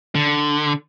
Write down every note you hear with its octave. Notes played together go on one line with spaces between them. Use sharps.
D3